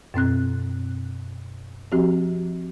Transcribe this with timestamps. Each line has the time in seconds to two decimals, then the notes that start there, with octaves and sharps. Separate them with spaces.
0.14 F#2 B2 C4 F#6
1.92 F3 C4 F#4 G4